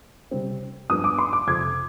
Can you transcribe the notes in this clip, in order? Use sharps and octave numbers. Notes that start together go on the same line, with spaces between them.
C3 G3 C4
G2 F3 B3 D4 D#6
D6
C6
D6
F2 C3 F3 C4 G#6